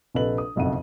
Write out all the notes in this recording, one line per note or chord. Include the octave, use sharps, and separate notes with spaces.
A#1 C3 A4 B4 D#5 F#7
D#6
F#1 B1 F2 E5 F#5 D#7